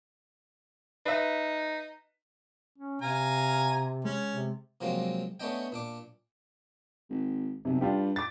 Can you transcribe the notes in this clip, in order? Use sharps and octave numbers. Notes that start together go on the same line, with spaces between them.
D#4 B4 E5
C#4
C3 F5 G#5 A#5
G#3 C#4
C3
C3 F3 F#3 G#3 A#3 C4
A3 B3 C#4 D4 D#5 G5
A#2 D4 D6
G#1
B1 C3
G2 D4 F4 G4
D6 A6